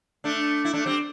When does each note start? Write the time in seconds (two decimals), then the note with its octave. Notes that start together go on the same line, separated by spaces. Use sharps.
0.24 A3 D4
0.65 E4
0.74 A3 D4
0.86 G3 C4